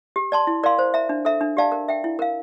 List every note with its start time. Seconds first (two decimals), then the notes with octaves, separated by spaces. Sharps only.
0.16 G4
0.32 D5 A5 C6
0.47 E4
0.63 A#4 D5 F5 C6
0.79 C5
0.94 E5 A#5
1.09 D4
1.25 A4 E5 A#5
1.41 D4
1.57 G4 D5 F5 A5
1.72 A#4
1.88 E5 G5
2.04 E4
2.19 A#4 F5